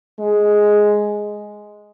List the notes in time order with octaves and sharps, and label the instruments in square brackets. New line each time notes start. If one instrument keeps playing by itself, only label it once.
[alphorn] G#3